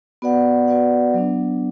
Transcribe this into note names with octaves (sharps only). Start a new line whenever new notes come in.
B3 F#4 B4 D5 F#5
B3 F#4 B4 D5 F#5
F#3 B3 D4